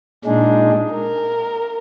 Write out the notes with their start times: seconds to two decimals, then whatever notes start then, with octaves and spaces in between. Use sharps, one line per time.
0.25 A#2 G#3 D4 D#4 G#4
0.91 A#4